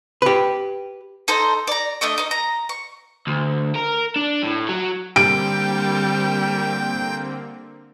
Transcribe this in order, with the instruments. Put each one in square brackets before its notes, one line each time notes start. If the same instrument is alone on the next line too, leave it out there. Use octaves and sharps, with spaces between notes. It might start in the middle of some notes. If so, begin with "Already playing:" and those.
[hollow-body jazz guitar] G4 B4
[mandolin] D#4 A4 C5 A#5
D5 A#5
A3 D4 D#5 C#6
D#4 D#5
A#5
C#6
[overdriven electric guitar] D2
A#4
D4
A2
F#3
[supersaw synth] D3 A#3 C4 [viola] G3 [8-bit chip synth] G5 [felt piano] D7